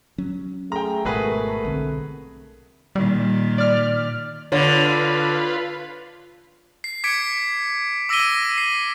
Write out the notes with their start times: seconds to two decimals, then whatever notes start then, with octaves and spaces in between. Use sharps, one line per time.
0.18 F#3 C#4
0.72 A3 G#4 G5 A#5
1.05 G#1 B2 G#3 F#4 G#4 A#4 B4
1.65 B1 D3 C4
2.96 A#2 D#3 G3
3.58 D5 F6
4.52 D3 F4 B4 C#5
6.84 C7
7.04 D6 G#6 B6 C#7 D7
8.09 D6 E6 A#6 B6 D#7 G7
8.58 C7